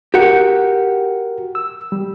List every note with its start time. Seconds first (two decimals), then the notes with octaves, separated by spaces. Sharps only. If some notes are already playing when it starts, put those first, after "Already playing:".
0.14 F#4 G4 A#4 F#5
1.55 E6
1.92 G3